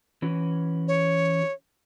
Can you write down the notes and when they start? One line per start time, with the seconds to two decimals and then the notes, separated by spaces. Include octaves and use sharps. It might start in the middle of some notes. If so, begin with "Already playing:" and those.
0.22 E3 C#4 F#4
0.88 C#5